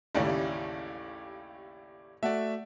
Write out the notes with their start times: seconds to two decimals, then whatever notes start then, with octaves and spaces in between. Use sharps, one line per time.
0.15 A1 D#2 C#3 E4 G4 D5
2.23 A3 F#4 D5 E5